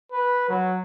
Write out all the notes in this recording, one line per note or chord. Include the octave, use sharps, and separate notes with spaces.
B4
F#3